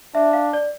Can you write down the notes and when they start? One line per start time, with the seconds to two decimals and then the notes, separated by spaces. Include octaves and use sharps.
0.15 D4 E5
0.33 F5
0.53 D5